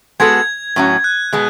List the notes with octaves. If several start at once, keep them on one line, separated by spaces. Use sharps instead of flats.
G#3 B3 F#4 A4 G#6
A2 F#3 C#4 F#4
F#6
B2 G#3 B3